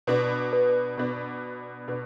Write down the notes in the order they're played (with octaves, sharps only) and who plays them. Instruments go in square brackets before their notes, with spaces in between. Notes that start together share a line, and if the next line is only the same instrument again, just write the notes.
[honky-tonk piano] B2 B3 D4 [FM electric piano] B4
[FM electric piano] B4
[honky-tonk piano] B2 B3 D4
B2 B3 D4